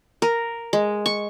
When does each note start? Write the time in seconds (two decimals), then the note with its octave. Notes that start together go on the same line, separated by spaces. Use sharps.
0.22 A#4
0.73 G#3
1.06 C#6